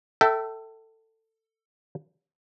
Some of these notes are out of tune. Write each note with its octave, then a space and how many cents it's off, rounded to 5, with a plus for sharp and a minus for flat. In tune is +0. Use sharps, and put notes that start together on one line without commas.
A4 +20 E5 +0 G5 -25